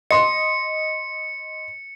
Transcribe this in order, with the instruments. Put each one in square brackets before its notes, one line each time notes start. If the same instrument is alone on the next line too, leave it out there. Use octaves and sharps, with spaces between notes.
[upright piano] D#5 C6 [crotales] C#7